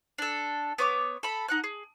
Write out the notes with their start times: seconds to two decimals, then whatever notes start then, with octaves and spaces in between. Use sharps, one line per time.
0.18 D4 A4
0.78 B3 C#5 D6
1.23 A4 B5
1.48 D#4 F#5 F#6
1.64 G#4